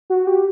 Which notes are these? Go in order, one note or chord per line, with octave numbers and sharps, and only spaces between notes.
F#4
G4